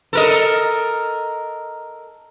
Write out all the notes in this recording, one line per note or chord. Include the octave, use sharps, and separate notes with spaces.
A4 A#4 D#5